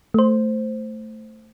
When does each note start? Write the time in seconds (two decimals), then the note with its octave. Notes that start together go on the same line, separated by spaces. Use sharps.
0.14 A3 C5